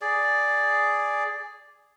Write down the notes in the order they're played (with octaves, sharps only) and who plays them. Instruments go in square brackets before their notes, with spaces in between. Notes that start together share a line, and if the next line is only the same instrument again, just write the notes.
[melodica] G#4 D5